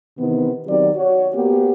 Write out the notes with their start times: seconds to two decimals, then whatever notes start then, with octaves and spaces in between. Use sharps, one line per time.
0.18 C3 D#3 E3 B3
0.66 D#3 F#3 B3 C4 G4 D5
0.95 F#4 C#5
1.35 A#3 B3 F#4 G4